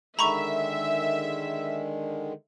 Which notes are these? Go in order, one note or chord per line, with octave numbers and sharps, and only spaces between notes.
D3 D#3 G#3 E5 A#5 B5 C#6